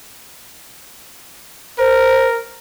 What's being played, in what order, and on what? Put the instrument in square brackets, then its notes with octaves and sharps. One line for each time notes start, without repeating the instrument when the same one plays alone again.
[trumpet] A#4 [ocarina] C5